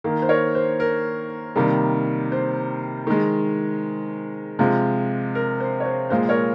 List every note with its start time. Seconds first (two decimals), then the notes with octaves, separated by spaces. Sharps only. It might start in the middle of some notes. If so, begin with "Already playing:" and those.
0.04 D#3 A#3
0.22 C5
0.29 A#4 C#5
0.55 C5
0.80 A#4
1.56 C3 D#3 G3 A#3
2.32 C5
3.07 D#3 G#3
4.59 C3 F3 G#3
5.35 A#4
5.60 C5
5.80 C#5
5.86 C5
6.10 A#2 F3 G#3 C5
6.29 A#4 C#5